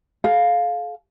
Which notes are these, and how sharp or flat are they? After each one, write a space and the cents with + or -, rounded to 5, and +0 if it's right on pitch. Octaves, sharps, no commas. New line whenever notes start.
A4 -40 F5 +10